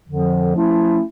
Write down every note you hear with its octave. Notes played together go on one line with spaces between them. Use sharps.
F2 D3 F3
F3 A3 C#4 E4